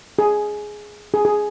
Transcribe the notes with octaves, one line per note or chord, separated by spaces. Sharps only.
G#4
G#4
G#4